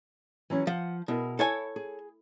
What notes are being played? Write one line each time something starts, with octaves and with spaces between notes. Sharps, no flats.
E3 F#3 C#4
F3 F#5
B2 E4 G#4 A#4
E4 A4 C#5 G#5
G#4